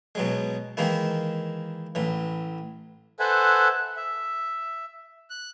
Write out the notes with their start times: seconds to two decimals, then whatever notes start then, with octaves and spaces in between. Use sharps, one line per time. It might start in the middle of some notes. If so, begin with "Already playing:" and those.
0.15 B2 F#3 G#3
0.77 D#3 E3 G#3 A#3 E4
1.95 A1 E3
3.20 A4 B4 C5 E5 F#5 G#5
3.96 E5
5.30 F#6